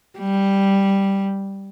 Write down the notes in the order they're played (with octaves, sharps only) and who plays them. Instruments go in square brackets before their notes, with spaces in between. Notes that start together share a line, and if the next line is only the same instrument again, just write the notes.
[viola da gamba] G3